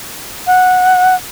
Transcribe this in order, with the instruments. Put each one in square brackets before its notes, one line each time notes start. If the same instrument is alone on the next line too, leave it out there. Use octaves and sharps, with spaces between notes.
[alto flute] F#5